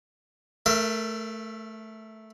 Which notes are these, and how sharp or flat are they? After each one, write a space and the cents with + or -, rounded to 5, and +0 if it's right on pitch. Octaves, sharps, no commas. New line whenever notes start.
A3 -5 A#4 +0 E5 +35